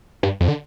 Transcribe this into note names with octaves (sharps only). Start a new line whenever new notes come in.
G2
F2
D3